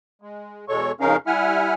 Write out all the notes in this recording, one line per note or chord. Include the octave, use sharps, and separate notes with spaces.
G#3
E2 B2 G#3 A4 C#5 C#6
F2 C#3 C#4 D#4 A#4 F5
G3 E4 E5 F#5 G#5 F6